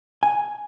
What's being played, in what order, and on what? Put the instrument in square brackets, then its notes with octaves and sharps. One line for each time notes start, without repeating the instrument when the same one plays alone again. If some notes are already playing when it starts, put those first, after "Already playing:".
[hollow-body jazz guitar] G#5